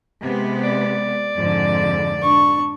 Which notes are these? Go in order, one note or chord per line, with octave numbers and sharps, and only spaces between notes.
C3 G#3 B3
D5
F2 G#2 D3
D4 C#6